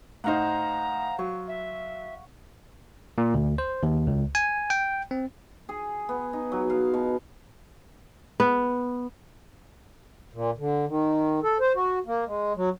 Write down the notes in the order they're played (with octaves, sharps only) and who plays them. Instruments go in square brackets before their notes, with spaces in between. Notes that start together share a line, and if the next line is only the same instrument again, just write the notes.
[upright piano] A2 D#4 [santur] C5 F5 F#5 [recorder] A#5
[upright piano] F#3 [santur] C#6
[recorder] E5
[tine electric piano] A#2
D2
C5
D#2
C#2
G#5
G5
C4
[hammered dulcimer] G#4
B3
D#4
F#3
F5
B2
[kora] B3
[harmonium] A#2
D3
D#3
A4
C5
F#4
A#3
G#3
F#3